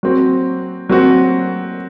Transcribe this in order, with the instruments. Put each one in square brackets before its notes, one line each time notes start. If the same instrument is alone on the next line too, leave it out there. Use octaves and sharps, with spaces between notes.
[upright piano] F#3 C4 F#4
F#3 C4 F#4